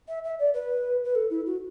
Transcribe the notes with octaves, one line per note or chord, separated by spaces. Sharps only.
E5
E5
D5
B4
B4
A4
E4
F#4